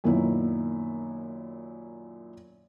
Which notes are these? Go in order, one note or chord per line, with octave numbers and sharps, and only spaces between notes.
F#2 A#2 D#3 B3 E4